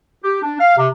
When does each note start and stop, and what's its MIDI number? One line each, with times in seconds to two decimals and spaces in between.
0.23 0.40 67
0.42 0.55 62
0.60 0.77 77
0.77 0.88 48